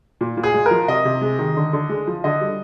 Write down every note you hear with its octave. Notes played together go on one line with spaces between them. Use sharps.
A#2
A#2
G#4
G#3
A#4
F3
C3 D#5
C3
G#3
D#3
D3
D3
G#3
F3
D3 D#5
G3